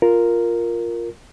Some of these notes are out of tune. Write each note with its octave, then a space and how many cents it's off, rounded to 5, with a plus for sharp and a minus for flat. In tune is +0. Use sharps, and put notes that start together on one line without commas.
F4 +0 A#4 +0